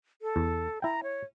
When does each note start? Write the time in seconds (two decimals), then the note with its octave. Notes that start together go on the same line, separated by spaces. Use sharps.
0.22 A4
0.36 E2
0.82 E4 G5 A#5
1.03 C#5